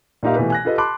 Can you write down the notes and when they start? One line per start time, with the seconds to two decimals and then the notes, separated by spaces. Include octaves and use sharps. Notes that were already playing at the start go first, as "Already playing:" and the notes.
0.23 A#2 A#3 D#4 G4 E5 F5
0.36 B2 E3 A3 G4 B4
0.50 G#5 F#6 A#6
0.65 F4 G4 A4 B4 D#5
0.78 A5 B5 C6 D6 F#6